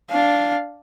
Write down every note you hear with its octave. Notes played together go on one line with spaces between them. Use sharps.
D4 F5